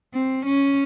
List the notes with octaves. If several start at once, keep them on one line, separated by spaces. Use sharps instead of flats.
C4
C#4